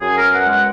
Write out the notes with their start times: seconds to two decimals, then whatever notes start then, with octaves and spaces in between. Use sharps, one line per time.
0.01 F#2 G#4
0.17 A#4
0.23 B3
0.33 F#5
0.44 G#3
0.50 F#5